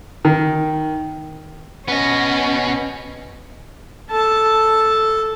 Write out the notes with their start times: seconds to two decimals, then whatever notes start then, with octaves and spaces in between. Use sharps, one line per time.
0.25 D#3
1.88 B3 C#4 D#5
4.10 A4 A5